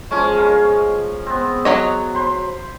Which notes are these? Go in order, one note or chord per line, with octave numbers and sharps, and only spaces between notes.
F3 G#3 C#4 C#5
C#4 A#4 F5
B3 C4
F#3 C#5 D#5
C5 B5 C6